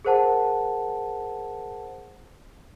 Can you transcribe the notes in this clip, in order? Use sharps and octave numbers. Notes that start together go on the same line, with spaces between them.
G#4 A#4 C5 F#5 A5